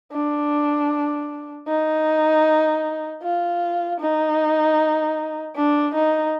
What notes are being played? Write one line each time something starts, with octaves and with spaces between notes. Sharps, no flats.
D4
D#4
F4
D#4
D4
D#4